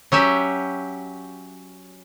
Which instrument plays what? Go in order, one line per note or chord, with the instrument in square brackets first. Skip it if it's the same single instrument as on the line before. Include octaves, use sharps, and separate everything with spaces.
[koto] F#3 C#4 G4 E5